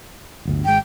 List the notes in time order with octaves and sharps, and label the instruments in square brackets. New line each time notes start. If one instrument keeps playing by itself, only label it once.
[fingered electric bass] D1 G1 D2
[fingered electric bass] G#1 G#3 [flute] G5